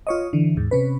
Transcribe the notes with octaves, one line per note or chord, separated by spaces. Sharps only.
F4 C#5 D#5
D3 E3
D#2 G#2
C3 C#4 B4